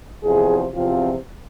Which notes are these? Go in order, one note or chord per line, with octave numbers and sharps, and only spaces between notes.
E2 C3 F3 G#4
E2 C3 F3 C4 F4